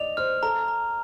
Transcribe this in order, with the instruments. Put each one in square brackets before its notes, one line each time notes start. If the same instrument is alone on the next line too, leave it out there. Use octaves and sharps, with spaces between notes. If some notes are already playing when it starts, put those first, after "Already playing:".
Already playing: [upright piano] D5 D#5 [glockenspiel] F7
[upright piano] C5 [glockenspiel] F6
[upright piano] A4 [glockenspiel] A#5
[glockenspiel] A#5